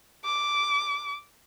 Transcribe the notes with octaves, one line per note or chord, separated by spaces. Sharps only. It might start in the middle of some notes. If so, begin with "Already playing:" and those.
D6